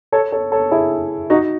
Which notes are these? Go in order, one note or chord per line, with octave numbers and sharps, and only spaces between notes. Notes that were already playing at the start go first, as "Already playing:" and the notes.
A4 C#5
A4 C#5
A4 C#5
E4 G#4
D#4 F#4